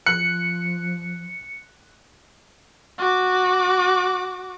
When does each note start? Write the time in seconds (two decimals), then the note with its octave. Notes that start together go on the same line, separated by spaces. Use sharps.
0.06 F3 F#6 C#7
2.99 F#4 D6